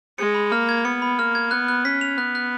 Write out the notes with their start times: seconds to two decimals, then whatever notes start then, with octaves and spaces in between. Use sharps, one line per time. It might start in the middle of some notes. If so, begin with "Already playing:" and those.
0.18 G#3 C#7
0.35 B5
0.52 A#3 F6
0.69 G#6
0.84 B3 C#7
1.02 B5
1.19 A#3 F6
1.35 G#6
1.51 B3 F#6
1.68 F#6
1.84 C#4 B6
2.01 F7
2.17 B3 F#6
2.35 F#6